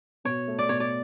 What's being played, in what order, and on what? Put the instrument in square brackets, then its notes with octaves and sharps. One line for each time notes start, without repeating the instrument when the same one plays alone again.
[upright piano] B2 [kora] C#5
[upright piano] A3
[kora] D5
[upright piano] B2 [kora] C#5
[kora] D5